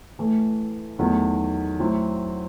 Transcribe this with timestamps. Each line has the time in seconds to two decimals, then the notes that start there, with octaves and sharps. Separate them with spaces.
0.19 A2 E3 A3
0.99 E2 D#3 F#3 A3 D#4
1.79 A2 F#3 C4 E4